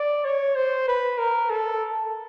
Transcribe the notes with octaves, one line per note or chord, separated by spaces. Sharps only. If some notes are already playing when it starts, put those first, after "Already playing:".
Already playing: D5
C#5
C5
B4
A#4
A4